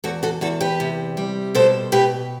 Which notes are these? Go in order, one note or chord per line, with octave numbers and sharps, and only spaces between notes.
E2 F#4 A4
F#4 A4
E2 F#4 A4
G4 B4
C3
G3
B2 A4 C5
B2 G4 B4